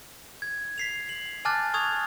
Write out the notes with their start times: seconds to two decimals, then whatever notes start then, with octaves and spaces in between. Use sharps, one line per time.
0.42 G#6
0.78 B6 C7 F7
1.09 F#7
1.45 G#5 A5 D6 F6 F#6 A6
1.74 C#6 D#6 G#6 F7